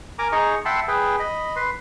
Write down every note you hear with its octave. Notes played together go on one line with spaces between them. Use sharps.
A#4 G#5 A#5 D6
D#4 G#4 D#5 A#5 C#6
E5 F#5 G5 A5 B5 C6
G#4 B4 G5
D#5 B5
B4 C6